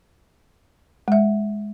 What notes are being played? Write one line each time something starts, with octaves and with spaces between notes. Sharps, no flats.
G#3 E5